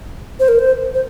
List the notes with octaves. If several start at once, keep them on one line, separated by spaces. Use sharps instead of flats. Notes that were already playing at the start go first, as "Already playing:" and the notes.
C5
A#4
C5
C5